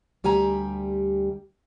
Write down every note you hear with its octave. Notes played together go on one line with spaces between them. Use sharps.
D2 G3 G4 G#5 A#5